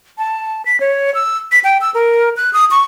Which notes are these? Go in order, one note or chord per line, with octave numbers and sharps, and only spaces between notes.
A5
B6
C#5
E6
B6
G5
E6
A#4
F#6
D#6
C#6